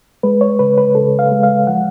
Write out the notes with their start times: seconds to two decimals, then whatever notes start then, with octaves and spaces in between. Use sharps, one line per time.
0.23 G#3 B4
0.41 C#5
0.59 C#3 B4
0.78 B4
0.95 C#3 A4
1.19 F5
1.31 G#3
1.43 F5
1.67 F3 F#5